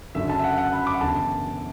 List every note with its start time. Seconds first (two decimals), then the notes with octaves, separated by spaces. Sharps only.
0.15 F#1 F#2 D3 E5
0.29 A5
0.39 E5
0.44 F#5
0.58 F#5
0.72 B5
0.87 D6
0.94 F#5
1.01 F#1 E2 D3 A5